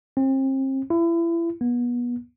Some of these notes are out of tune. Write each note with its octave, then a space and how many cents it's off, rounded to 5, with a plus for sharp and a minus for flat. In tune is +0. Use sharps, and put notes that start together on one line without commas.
C4 +35
E4 +30
B3 -30